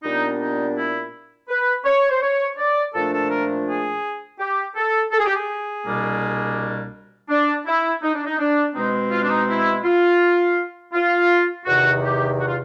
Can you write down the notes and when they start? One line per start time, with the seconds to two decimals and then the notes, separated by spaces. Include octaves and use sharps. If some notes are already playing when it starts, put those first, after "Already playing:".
0.04 A#2 G3 B3 D4 D#4
0.40 D#4
0.76 E4
1.48 B4
1.85 C#5
2.10 C5
2.22 C#5
2.58 D5
2.93 A#2 F3 A3 D4 A4
3.12 A4
3.30 A#4
3.66 G#4
4.39 G4
4.76 A4
5.12 A4
5.19 G#4
5.26 G4
5.33 G#4
5.84 C2 B2 G3 A#3 D4
7.29 D4
7.66 E4
8.02 D#4
8.14 D4
8.26 D#4
8.39 D4
8.75 B2 G#3 C4 D#4
9.11 F4
9.23 D4
9.30 D#4
9.48 E4
9.84 F4
10.94 F4
11.66 E2 C3 D#3 F#4
12.02 G4
12.39 F#4
12.47 F4